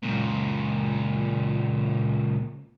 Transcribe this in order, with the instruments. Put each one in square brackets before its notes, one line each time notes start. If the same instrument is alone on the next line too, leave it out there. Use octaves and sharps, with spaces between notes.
[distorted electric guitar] C#2 A#2